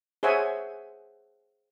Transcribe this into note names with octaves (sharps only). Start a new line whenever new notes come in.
G#4 C5 C#5 E5 F#5 G#5